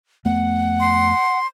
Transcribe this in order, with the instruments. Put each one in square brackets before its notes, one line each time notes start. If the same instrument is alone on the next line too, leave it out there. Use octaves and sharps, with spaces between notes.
[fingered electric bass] F2 A3 B3 [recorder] F#5
[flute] C6